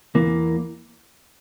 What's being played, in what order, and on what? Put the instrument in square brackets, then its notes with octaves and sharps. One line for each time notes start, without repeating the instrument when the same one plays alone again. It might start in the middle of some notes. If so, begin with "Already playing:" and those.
[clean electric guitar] E2 E3 A#3